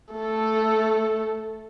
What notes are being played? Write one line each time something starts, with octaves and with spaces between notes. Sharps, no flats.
A3 A4